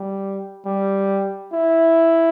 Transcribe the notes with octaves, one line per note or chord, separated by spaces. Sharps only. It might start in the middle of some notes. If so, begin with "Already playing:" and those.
Already playing: G3
G3
E4